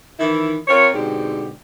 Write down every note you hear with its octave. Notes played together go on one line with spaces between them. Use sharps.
D#3 E3 E4
C4 F4 A#4 C#5
G#2 B2 D3 C4 G4